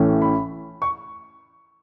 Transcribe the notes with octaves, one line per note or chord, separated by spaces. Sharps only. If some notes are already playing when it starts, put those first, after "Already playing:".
Already playing: A1 A2 E3 A3 C#4
B5
C#6